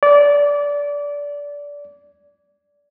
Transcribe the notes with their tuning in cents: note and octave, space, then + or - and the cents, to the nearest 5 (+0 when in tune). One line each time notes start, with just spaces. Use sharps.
D5 -20